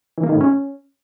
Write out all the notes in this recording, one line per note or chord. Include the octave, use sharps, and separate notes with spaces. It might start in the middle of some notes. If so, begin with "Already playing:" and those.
E3
A#3
D#3
A2
C#4